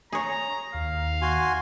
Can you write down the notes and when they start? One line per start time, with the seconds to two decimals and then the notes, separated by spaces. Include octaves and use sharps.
0.12 G#4 C#5 A#5
0.74 D#2 F5
1.22 F#4 G#5 C6